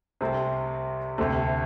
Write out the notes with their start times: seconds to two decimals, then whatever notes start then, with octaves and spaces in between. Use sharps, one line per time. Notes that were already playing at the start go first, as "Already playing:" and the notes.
0.21 C2 C3 A3 C4
1.18 D2 C3 A3